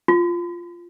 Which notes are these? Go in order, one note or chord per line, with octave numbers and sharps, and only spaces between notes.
F4